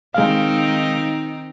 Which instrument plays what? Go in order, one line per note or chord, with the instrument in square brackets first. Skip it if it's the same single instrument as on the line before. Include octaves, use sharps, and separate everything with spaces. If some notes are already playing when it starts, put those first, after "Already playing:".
[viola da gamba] D#3 C4 D#4 [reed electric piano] G#3 F5